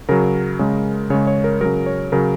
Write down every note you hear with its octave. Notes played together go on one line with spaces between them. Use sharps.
C#3 F#3 A#4
C#3 G#3
C#3 G#3 C#5
C#5
A#4
C#3 F#3 A#4
C#5
C#3 F#3 A#4